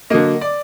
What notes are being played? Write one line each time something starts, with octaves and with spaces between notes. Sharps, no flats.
D3 F#3 A#3 D#5
D5